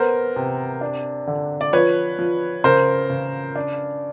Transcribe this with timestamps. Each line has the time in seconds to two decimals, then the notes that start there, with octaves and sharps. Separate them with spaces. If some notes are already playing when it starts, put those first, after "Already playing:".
Already playing: B3 A#4 C5
0.36 C3
0.81 D4
1.27 D3
1.61 D5
1.73 F3 B4 C#5
2.19 F3
2.64 C#3 A#4 C5
3.10 C#3
3.56 D4